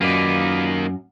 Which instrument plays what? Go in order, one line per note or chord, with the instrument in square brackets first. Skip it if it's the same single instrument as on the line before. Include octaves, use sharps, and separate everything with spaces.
[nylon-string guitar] F#2 [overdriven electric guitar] A#3 D#4 [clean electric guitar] F4 B4 D5